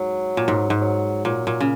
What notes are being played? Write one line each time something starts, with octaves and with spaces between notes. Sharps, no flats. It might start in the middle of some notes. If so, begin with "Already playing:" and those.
Already playing: G#2 F#3
A#2
G#2
G#2
F#3
A#2 F#3
A#2
C#3